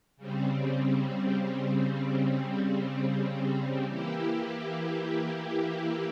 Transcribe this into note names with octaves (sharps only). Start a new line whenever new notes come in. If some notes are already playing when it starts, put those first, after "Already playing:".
C#3 G3 C4
E3 A#3 E4 G4